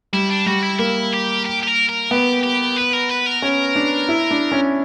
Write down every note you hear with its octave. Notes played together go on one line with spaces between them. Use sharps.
G3 E4
D4
G3 F#4
E4
A#3 E4
G4
G4
G4
A#4
A#4
B3 G4
G4
B4
A#4
B4
A#4
C#4
D4
E4
D4
C#4